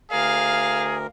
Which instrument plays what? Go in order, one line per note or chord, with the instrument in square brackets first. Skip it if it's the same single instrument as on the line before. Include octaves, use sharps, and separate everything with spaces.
[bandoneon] D2 A#4 [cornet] G#4 [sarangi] F5